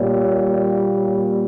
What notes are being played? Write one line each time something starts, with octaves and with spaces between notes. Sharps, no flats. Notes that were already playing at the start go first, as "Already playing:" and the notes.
Already playing: A#2 G3 A#3 C#5